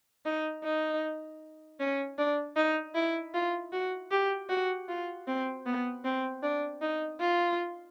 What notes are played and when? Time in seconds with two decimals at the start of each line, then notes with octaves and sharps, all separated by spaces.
0.25 D#4
0.64 D#4
1.80 C#4
2.19 D4
2.57 D#4
2.95 E4
3.34 F4
3.73 F#4
4.11 G4
4.50 F#4
4.89 F4
5.27 C4
5.66 B3
6.04 C4
6.43 D4
6.82 D#4
7.21 F4